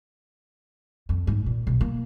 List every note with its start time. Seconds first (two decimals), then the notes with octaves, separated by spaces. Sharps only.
1.09 F2
1.27 G#2
1.46 A#2
1.67 B1
1.81 A#3